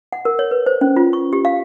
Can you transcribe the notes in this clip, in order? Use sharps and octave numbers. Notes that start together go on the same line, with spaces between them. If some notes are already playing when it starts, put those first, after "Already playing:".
F#5
A#4
C#5
B4
C5
C#4
F4
C#6
G4
F5